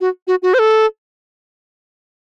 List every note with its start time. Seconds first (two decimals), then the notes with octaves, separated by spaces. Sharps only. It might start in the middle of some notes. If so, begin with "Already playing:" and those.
0.01 F#4
0.27 F#4
0.42 F#4
0.54 C5
0.59 A4